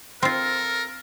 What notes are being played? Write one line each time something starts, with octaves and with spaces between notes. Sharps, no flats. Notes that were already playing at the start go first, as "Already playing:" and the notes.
C4 F4 A4 A#4